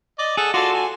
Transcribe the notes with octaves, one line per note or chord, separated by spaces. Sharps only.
D5 D#5
G#4 A4 F#5
F4 F#4 A4 D5 C6
G#5